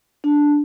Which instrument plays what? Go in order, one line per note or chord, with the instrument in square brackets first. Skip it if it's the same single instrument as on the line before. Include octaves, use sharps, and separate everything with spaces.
[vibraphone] D4